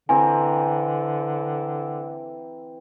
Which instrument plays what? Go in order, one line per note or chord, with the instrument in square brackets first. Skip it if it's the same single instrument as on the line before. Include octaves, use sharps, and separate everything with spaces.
[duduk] D3 [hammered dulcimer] E3 C4 A#5 [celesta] G#5